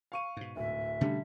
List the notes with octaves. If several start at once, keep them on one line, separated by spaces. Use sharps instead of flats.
F5 C#6 D#7
G#2 B2
D1 E5
B2 D3 G3 A3 C#4